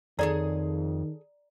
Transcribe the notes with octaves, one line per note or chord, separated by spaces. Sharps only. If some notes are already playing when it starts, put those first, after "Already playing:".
F2 D#3 G#4 A4 C#5 D5 A#5